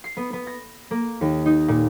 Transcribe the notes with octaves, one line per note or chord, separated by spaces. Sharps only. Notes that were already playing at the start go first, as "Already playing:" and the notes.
C7
B3
B3
A#6
A#3
D#2
D#4
A#2